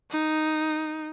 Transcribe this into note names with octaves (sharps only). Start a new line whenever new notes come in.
D#4